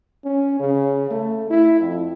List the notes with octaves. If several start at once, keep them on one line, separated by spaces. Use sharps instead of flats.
C#4
C#3
A3
E4
F2